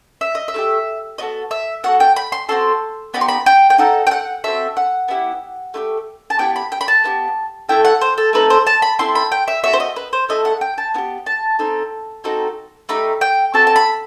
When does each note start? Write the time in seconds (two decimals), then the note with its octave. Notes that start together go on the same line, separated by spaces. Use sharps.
0.21 E5
0.35 D#5
0.48 E5
0.54 A3 E4 G4
1.18 B3 F#4 A4 D#5
1.51 E5
1.84 B3 F#4 A4 F#5
2.00 G5
2.16 B5
2.32 C6
2.49 C4 F#4 A4 C6
3.14 B3 D#4 G4 B5
3.21 C6
3.28 B5
3.46 G5
3.70 G5
3.78 D#4 A4 F#5
4.07 G5
4.11 F#5
4.44 C4 F#4 A4 E5
4.77 F#5
5.08 B3 E4 G4
5.74 A3 E4 G4
6.30 A5
6.39 B3 E4 G4 G5
6.56 B5
6.72 G5
6.81 B5
6.88 A5
7.04 B3 E4 G4
7.69 A3 E4 A4 G5
7.85 F#5
8.01 C5
8.18 A4
8.33 A3 C4 D#4 A4 B4
8.50 C5
8.67 A5
8.82 B5
8.99 C4 E4 A4 C6
9.15 B5
9.32 G5
9.48 E5
9.64 B3 F#4 A4 E5
9.73 C5
9.80 D#5
9.96 B4
10.13 C5
10.29 A3 E4 A4 D#5
10.45 F#5
10.61 G5
10.78 A5
10.94 B3 E4
10.98 G4
11.26 A5
11.59 C4 D#4 A4
12.24 C4 D#4 F#4 A4
12.89 A3 D#4 G4 B5
13.21 G5
13.54 C4 F#4 A4 A5
13.67 A5
13.76 B5